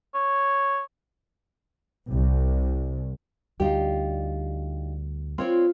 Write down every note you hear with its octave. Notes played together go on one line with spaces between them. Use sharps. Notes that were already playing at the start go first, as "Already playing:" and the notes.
C#5
C2
D2 G3 D4 D#4 F4 G4
C4 F4 C#5 D5